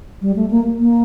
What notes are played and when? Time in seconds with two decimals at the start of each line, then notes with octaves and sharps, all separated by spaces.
0.22 G3
0.36 A3
0.51 A#3
0.79 A#3